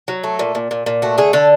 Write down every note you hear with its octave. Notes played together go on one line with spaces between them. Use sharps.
F#3
A3
A#2
A#2
A#2
A#2
A3 F#4
D3 G#4
D3 A4